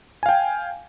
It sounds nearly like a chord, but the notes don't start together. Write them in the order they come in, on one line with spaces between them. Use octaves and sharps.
G#5 F5 G5